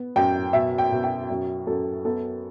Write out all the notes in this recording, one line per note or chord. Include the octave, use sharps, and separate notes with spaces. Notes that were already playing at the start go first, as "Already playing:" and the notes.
Already playing: B3
F#2 G5
B2 E5
G5
B2
G5
F#2
F#2 A4
B3 A4